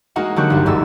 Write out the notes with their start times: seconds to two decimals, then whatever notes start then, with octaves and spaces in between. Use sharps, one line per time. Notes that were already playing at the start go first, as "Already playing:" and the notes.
0.16 G#3 A#3 D#4 F#4 F#5
0.36 D3 F#3 A#3 G4 C#6 F#6
0.50 G1 C2
0.66 D#1 G#2 G3 E6